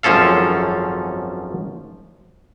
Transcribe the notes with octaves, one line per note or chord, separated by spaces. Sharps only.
G#1 F#2 F3 C#4 A4 F5